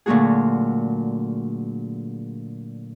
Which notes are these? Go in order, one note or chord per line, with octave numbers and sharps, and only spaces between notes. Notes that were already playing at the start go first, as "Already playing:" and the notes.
A#2 D3 F#3 A3 F#4 G#4